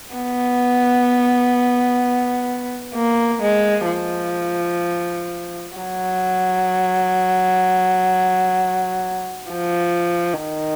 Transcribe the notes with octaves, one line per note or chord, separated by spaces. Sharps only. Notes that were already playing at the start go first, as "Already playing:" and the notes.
B3
A#3
G#3
F3
F#3
F3
D#3